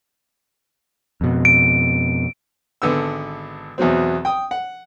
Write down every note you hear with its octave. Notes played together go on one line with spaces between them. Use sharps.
F2 B2
D7
G#1 D3 B3 E6
E2 B2 F#3 C4
G5 D#6
F#5